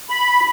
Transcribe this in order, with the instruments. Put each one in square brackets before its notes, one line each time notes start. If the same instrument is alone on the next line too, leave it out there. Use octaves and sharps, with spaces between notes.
[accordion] B5